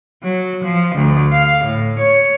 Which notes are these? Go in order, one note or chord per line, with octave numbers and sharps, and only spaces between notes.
F#3
F3
D2
F5
A2
C#5